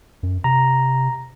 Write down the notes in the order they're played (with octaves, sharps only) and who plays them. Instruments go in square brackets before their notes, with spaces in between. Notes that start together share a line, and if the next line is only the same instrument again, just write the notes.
[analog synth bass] F#2
[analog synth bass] C3 [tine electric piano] A#5